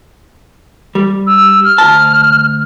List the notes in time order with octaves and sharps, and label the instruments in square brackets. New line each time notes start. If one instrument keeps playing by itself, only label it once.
[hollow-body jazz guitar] G3
[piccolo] E6
F6
[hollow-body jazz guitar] D2 A5